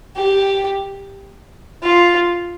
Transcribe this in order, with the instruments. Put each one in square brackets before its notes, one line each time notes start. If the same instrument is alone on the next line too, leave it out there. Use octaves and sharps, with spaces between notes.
[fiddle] G4
F4